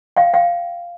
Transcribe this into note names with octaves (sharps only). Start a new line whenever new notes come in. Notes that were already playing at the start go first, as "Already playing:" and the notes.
F5 G5
F5 G5